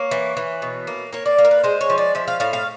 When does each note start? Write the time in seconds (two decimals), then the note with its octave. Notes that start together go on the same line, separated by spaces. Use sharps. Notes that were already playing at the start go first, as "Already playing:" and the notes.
Already playing: A#3 C#5
0.11 E3
0.37 E3
0.62 B2
0.87 A#3
1.13 A#3 C#5
1.26 D5
1.38 A#3
1.45 A#4
1.51 B4
1.63 G#3 C5
1.81 C#5
1.90 F3
1.98 D5
2.15 F3 E5
2.28 F5
2.40 A2 F5
2.53 F5